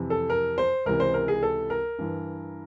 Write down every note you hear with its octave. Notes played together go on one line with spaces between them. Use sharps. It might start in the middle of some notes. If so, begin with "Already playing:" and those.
Already playing: F2 C3 E3
A4
A#4
C5
C#2 C3 E3 A#4
C5
A#4
G#4
A4
A#4
G2 E3